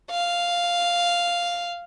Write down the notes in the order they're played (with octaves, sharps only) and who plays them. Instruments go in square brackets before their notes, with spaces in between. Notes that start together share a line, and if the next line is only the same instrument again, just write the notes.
[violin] F5